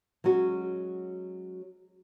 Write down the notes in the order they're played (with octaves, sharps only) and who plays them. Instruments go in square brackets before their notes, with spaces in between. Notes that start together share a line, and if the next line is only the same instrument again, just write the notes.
[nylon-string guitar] F#3 G#3 C#4 F#4